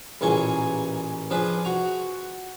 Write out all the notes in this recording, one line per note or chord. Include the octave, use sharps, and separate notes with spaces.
A1 A#2 E3 G#4 G#5 C#6
F3 D4 G#4 B4
F#4 A#5